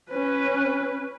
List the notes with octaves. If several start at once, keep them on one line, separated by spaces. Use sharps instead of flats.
C#4 B4